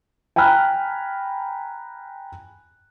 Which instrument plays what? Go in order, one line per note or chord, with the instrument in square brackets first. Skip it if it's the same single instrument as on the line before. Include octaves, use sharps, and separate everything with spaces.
[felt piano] G5 G#5 A#5 B5 F6 F#6